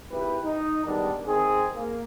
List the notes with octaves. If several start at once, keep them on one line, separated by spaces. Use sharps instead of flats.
G#1 E4 G4 B4
D#4
D#3 G3 G#3 B3 D4
D#3 C4 G#4
A#3